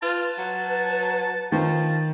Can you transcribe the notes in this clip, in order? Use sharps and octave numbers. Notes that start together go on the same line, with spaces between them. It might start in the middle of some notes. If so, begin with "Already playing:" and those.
F4 B4 A5
F#3
D#3 F3 A5